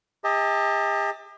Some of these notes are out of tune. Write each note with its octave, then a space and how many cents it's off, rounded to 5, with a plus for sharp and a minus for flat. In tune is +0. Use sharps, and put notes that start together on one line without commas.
G4 +45 D#5 +40 A5 +25